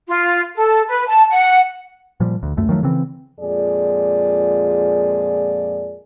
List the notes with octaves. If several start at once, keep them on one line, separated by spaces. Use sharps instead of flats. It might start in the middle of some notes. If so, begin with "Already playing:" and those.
F4
A4
B4
A5
F#5
A#2 F3 G3
D2
C#2 F#2 A3
D#3 F3 F#3 A3
C#3 E3 C4
F2 A#2 G#3 G#4 D5